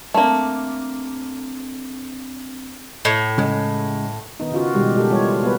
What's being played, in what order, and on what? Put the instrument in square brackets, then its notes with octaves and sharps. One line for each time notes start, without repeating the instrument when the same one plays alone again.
[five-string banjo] A3 A#3 [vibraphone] C4 D4
[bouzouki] A2
[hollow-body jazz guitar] C#3 G#3
[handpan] D#3 B3 D#4
C#3 F4 F#4
B2 D#3 G3 G#3 G4
B2 G#3 G4 A4
E3 G3 F4 C#5
A#3 B3 B4